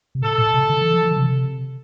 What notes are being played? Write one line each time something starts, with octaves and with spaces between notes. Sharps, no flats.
C3
A#2 A4
A#2
C3
D3
E3
F3
F3
D3
C3